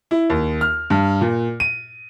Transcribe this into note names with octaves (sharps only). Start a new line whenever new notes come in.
E4
D#2
F6
G2
A#2
D#7